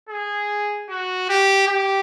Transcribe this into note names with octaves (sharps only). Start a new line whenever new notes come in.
G#4
F#4
G4
G4